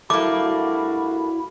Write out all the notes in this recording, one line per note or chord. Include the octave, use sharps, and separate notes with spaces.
G2 A3 A#3 E4 F#4 D6